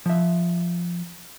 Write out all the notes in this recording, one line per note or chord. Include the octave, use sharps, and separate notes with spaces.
F3 E5